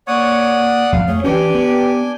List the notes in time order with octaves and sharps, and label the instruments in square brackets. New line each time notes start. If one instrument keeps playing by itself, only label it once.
[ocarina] A#3 [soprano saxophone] C#5 [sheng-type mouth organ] D5 F#5 D#6
[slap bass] F2 [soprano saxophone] F5
[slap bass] A3 [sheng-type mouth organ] G#4 [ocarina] C#5
[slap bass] E3 C#4 [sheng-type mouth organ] D4 G#5 G6 [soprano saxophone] G4 [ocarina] B4
[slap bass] B3